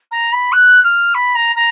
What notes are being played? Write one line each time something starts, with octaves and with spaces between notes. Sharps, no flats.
A#5
B5
F#6
F6
B5
A#5
A#5